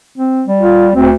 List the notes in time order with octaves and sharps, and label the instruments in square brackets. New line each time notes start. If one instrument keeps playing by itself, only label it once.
[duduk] C4
[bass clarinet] G3
[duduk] F4
[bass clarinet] D2 [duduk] C4